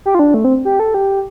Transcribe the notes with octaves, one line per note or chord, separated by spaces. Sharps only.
G4
F4
D4
A3
C4
G4
A4
G4